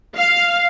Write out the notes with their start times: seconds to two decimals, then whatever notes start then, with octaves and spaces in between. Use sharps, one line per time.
0.16 F5